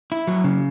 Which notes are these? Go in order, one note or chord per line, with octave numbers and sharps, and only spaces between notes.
E4
F#3
C#3